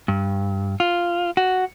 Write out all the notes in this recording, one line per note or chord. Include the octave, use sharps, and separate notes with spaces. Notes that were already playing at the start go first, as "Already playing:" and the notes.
G2
F4
F#4